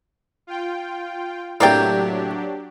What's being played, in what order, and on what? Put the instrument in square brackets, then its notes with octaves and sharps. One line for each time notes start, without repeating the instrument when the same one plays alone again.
[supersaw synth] F4 G5
[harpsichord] A2 C3 [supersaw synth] F#3 D4 G4 [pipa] A#3 D5 G5